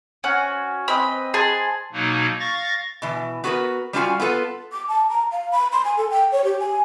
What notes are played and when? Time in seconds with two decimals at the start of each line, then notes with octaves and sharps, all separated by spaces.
0.24 C#4 F#4 G#5
0.88 C4 B4 D#5 B5
1.34 G#4 A5 B5 C6
1.93 B2 F#3 A#3 D#4
2.40 F5 C#6 A6 A#6
3.02 B2 E3
3.44 B3 F#4 G#4 A#4 B4
3.93 G3 C#4 D4 F4 F#4 G#5
4.20 B3 F4 A4 B4
4.72 D6
4.88 A5
5.09 A#5
5.32 F5
5.52 B5
5.72 C6
5.85 G#5
5.97 A4
6.10 G5
6.32 C#5
6.45 G4
6.60 G#5